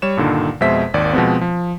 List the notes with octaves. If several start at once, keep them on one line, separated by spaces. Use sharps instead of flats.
G3 C#5 E7
G2 A#2 D3 D#3
F2 B2 G#3 C5 E5 B6
G#1 D#2 D5
B2 F3 G#3 B3 C4
F3